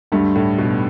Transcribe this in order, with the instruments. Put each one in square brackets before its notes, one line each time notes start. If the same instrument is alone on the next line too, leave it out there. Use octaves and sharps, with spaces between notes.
[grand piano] D2 D3 A3 [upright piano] G2
[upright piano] A2
B2